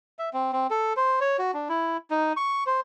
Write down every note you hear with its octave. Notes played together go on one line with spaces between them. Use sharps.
E5
C4
C4
A4
C5
C#5
F#4
D4
E4
D#4
C#6
C5